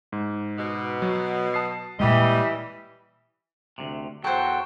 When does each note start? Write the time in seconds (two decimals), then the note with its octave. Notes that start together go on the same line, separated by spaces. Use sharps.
0.12 G#2
0.58 B2
1.02 F#3
1.54 A5 D#6 C7
2.00 A#2 E3 G3 G#3 D#5
3.78 D2 C3
4.24 E2 F#3 F#4 A4 C5 G5